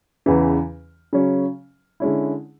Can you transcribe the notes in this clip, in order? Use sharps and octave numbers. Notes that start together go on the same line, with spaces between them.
E2 C#3 E3
C#3 F#3 C#4
D3 G#3 C#4 E4